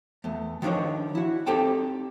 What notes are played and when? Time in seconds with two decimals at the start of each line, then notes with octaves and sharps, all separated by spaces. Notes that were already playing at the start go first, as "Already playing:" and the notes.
0.24 E2 A3
0.62 D#3 F3 D4 D#4 C#5
1.15 E4 F#4
1.46 C4 D#4 G4 A4 G5 A5